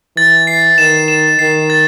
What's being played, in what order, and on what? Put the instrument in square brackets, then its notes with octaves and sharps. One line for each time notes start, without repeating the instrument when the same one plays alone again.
[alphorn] E3 [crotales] A6
[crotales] C7
[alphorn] D#3 [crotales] E7
[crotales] E7
[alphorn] D#3 [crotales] C7
[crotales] A6